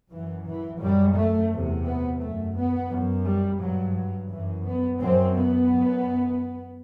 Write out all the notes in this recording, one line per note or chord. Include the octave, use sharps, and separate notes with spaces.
F#2 E3
E3
F#2 G3
A3
E2 C3
B3
F#2 A3
B3
F#2
G3
G2 F#3
F#3
F#2 E3
B3
F#2 C4
B3
F#2